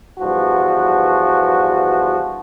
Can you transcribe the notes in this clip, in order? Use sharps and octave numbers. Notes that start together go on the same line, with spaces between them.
E2 G2 F3 F#4